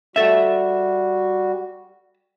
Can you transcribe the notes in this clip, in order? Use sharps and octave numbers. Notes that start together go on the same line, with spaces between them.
G3 F#4 A4 E5